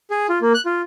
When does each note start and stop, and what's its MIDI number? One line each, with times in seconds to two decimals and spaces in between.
0.10 0.27 68
0.29 0.39 65
0.41 0.53 58
0.54 0.61 90
0.66 0.81 65